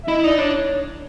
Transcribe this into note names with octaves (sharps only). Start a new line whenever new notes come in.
E5
E4 D#5
D#4 D5
D4 C#5